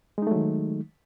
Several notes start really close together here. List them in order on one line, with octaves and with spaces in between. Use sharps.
G#3 D#4 A3 F#3 D#3